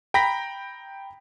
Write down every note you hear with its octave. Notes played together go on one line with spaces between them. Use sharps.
G5 A#5 B5 A#6 B6